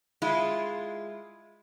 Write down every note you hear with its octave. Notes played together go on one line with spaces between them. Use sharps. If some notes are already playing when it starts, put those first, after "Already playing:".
G#3 E4 F4